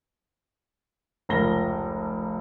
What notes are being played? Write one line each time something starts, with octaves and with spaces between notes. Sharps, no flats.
F1 C#2 A#4 A#6 G7